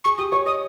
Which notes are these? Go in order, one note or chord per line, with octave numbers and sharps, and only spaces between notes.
G#4 C#6
G4 D#6
C#5 C#6
D#5 D#6